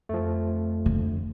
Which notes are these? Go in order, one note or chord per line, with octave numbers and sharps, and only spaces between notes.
F2 F3 A3
D3